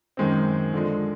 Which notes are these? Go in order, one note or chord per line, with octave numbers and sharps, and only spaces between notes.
F#2 D#3 G#3 C4
D3 F3 G#3